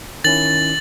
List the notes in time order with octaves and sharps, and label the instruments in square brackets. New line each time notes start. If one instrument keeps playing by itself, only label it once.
[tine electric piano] D#3 C#4 E4 [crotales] A6 F#7